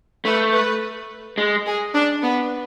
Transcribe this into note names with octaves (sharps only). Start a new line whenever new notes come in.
A3 B4
B4
G#3
G#4
D4
B3